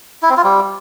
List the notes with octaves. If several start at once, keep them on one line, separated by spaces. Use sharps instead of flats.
E4
C4
F4
G3